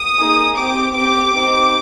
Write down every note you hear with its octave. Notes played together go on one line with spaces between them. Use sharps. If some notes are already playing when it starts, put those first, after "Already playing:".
Already playing: D#6
A#3 D#4 G#4
C4 G4 D6
C4 G4 D6
C4 D#4 G4